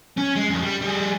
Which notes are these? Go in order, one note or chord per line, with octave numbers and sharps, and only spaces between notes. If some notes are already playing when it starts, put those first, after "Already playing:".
C#4
G#3
F2 C#3
G3
G3 G#4